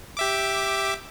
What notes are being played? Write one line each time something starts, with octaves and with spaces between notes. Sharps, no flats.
G4 E5 D6